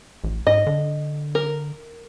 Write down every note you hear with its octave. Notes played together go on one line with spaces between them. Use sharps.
A1
G#2 D#5
D3
A#4